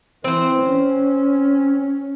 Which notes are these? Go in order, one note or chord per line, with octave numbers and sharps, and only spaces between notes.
E3 C4 C5
C#4